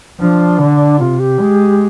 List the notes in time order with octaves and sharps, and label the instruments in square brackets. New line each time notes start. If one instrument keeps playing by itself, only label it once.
[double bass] F3 [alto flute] D4
[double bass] D3
[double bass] C3 [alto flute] F4
[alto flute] G4
[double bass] G#3